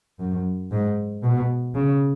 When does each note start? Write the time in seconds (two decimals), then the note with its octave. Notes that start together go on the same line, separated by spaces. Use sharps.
0.19 F#2
0.71 G#2
1.23 B2
1.75 C#3